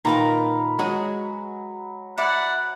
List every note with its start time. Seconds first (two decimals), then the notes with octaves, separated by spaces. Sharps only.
0.05 A#2 D#3 A#3 A#4 B4 F5 A#5
0.79 F#3 G#3 F#4 G#4
2.18 E4 D5 F#5